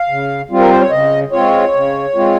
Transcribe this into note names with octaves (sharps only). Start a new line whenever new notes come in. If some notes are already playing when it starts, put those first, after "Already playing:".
Already playing: F5
C#3
G3 C4 F4
A#4
C5
C#5
C#3 D#5
G#3 C4 F4 C#5
C#3
G#3 C4 F4